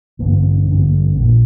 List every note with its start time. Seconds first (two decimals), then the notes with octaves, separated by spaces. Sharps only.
0.19 A1 G2 D3 A#3
0.32 C4
0.44 C4
0.56 D4
0.68 A1 G2 D3 C4
0.80 A#3
0.92 G3
1.04 C4
1.16 A#1 A#3
1.19 A#2